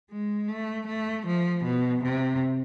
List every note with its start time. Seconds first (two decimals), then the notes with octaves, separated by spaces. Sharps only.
0.10 G#3
0.48 A3
0.86 A3
1.26 F3
1.64 B2
2.03 C3